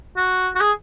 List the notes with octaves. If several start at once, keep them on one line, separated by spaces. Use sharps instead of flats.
F#4
F#4
G#4